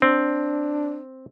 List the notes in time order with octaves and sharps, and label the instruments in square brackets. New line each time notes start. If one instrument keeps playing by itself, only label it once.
[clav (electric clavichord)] C4 [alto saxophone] D4